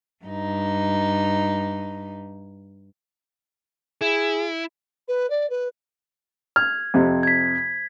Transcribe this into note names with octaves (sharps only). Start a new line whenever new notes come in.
G2 D#4
E4 G#4
B4
D5
B4
F6 G#6
F2 C3
G#6 B6